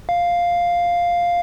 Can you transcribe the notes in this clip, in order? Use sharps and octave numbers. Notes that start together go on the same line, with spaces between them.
F5